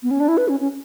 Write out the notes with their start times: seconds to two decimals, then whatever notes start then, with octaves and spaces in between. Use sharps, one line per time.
0.03 B3
0.11 C#4
0.20 D4
0.28 E4
0.37 B4
0.48 C#4
0.60 C#4